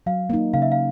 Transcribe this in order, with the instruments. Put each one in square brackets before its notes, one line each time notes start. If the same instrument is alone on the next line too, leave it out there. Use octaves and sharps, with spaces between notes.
[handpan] F#3 [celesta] F5
[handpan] A#3 D#4
[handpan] C#3 [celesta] F5
[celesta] E5
F5